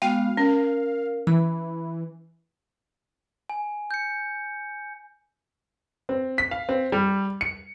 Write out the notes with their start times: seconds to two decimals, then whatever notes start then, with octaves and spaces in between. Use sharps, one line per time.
0.02 G#3 B3 F#4 F5 G5
0.37 C#4 A#4
1.27 E3 B5
3.50 G#5
3.91 G6 C#7
6.09 C4
6.38 B6
6.51 F5
6.69 C4
6.92 G3
7.41 C#7